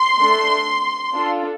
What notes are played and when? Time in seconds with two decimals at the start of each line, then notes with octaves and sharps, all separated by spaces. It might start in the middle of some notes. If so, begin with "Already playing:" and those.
Already playing: C6
0.20 A3 D4 A4
1.14 D4 F4 A4